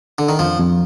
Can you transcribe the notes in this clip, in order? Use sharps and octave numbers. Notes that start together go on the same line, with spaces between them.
D3
D#3
F2 F3
F2